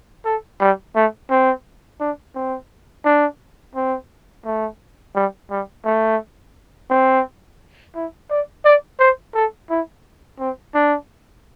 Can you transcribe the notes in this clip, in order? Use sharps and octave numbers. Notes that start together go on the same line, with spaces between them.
A4
G3
A3
C4
D4
C4
D4
C4
A3
G3
G3
A3
C4
E4
D5
D5
C5
A4
E4
C4
D4